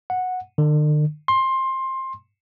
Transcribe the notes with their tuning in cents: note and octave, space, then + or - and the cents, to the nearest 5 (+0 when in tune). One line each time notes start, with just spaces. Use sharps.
F#5 -10
D3 +45
C6 +20